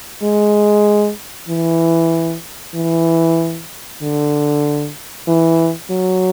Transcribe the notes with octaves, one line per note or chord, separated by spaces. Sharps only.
G#3
E3
E3
D3
E3
F#3